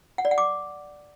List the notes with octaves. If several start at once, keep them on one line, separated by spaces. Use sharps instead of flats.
F#5
D5
F#5
D6